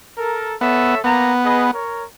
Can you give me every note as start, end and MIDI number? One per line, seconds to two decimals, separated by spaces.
0.18 0.54 69
0.18 0.54 70
0.61 0.95 59
0.61 0.99 69
0.61 0.99 73
0.61 0.99 76
1.04 1.32 58
1.04 1.71 59
1.04 1.32 82
1.44 1.67 68
1.44 1.67 71
1.44 1.67 75
1.73 2.04 70
1.73 2.04 73